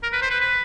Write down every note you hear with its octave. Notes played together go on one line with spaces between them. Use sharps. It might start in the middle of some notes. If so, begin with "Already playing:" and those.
A#4
B4
C5
B4
B4